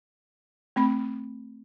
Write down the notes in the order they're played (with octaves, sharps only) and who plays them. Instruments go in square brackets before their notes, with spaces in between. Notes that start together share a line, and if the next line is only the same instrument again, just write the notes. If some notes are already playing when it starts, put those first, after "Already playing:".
[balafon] A3 C4 B5